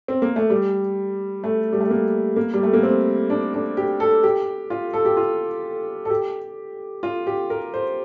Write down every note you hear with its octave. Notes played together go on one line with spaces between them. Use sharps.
C4
A#3
A3
G3
A3
G3
A3
A#3
A#3
G3
A3
A#3
C4
D4
D4
G4
A4
G4
F4
A4
G4
F4
A4
G4
F4
G4
A#4
C5